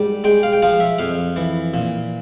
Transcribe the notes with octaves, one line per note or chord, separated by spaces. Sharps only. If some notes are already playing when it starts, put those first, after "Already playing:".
Already playing: G#2 G3
G#3 G5
F5
G5
F3 F5
E5
F2 F5
E3
A#2